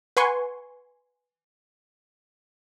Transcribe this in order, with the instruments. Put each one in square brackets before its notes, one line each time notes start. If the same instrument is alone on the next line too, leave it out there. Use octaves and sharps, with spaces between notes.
[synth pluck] B4 F#5 G#5 C6 C#6